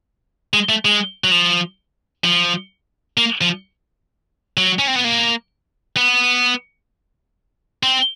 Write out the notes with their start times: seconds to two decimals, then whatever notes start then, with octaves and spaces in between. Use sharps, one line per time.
0.54 G#3
0.69 A3
0.85 G#3
1.24 F#3
1.31 F3
2.24 F3
3.17 A#3
3.41 F3
4.57 F#3
4.79 C#4
4.88 C4
4.96 B3
5.04 A#3
5.97 B3
7.83 C4